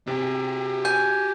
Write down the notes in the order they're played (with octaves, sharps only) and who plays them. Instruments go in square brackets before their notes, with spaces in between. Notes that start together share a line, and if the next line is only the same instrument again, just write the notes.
[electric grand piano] C3 [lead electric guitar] G4 G#4
[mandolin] G#5 [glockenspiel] G6